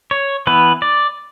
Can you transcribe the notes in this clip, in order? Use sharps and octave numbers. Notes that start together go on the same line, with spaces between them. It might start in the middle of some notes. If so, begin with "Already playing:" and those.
C#5
E3 B3 B4
D5